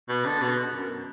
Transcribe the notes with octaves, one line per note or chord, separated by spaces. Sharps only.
B2
D3
B2
F#2